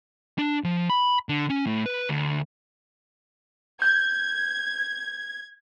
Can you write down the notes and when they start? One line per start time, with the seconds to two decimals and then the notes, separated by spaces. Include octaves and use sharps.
0.39 D4
0.64 F3
0.90 B5
1.29 D3
1.50 C#4
1.67 A2
1.86 B4
2.09 D2
3.82 G6 G#6